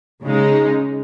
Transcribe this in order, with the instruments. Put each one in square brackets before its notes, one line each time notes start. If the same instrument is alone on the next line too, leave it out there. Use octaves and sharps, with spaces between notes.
[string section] C#3 G#3 D#4